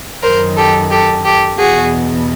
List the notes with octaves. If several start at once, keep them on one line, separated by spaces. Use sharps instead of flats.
F#2 D#3 A#4 C5
G4 A4
G4 A4
G4 A4
E2 B2 F#4 G#4